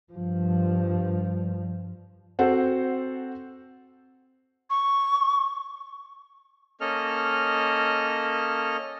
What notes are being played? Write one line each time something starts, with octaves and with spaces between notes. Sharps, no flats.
G2 F3
C4 F#4 A4 C5 F#5
C#6
A#3 C#4 A4 D#5 F6